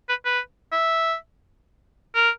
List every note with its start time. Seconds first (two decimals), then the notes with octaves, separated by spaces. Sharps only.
0.09 B4
0.25 B4
0.72 E5
2.15 A#4